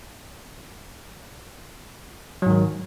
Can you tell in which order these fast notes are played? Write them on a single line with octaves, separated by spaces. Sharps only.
F#3 G#2 D#3